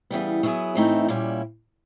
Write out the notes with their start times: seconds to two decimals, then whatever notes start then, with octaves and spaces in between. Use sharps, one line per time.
0.10 C#3 E3 G3 B3
0.43 F#3 B3 E4 G#4
0.75 A2 E3 A3 C4 D#4
1.08 A#2 G3 A#3 C#4 E4